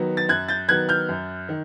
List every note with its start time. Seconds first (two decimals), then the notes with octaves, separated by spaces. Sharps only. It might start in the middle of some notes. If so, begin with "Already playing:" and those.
Already playing: D#3 F#3 B3
0.17 A6
0.29 F#2 F#6 G#6
0.48 G6 A6
0.69 D#3 F#3 B3 F#6 G#6
0.89 F6 G6
1.09 F#2
1.49 D#3